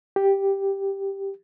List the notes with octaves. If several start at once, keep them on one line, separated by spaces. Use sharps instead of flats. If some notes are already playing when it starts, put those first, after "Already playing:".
G4